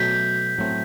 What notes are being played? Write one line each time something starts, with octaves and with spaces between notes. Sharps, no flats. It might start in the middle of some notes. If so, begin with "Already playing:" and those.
Already playing: B2 F#3 A3 G6 B6
A2 F#3 A3 C4